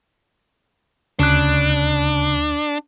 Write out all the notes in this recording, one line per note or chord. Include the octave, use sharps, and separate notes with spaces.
D2 C#3 D4 F#6